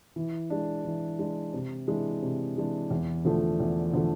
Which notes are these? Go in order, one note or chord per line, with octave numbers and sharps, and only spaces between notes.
E3
G#3 D4
E3
G#3 D4
C3
E3 G#3 D4
C3
E3 G#3 D4
E2
D3 F3 A3
E2
D3 F3 A3